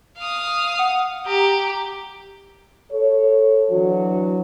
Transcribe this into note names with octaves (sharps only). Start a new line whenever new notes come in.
F5 D#6
F#5
G4 A#5
A4 C#5
E3 F#3 D4 F#4